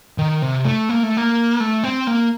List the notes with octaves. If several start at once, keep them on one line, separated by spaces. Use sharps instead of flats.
D#3
C3
A3
A#3
A3
A#3
A3
C4
A#3